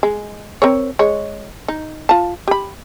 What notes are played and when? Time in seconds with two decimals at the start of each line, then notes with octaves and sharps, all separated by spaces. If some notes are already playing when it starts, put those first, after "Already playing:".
0.03 G#3
0.62 C4 A#4 C#5
0.99 G#3 C#5
1.68 D#4
2.09 F4 A5
2.48 G4 B5